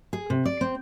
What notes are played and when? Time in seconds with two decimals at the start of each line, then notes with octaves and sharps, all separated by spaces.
0.13 G#4
0.30 C3
0.46 D5
0.61 C4